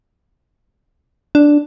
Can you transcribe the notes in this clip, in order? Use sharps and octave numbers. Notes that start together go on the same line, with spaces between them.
D4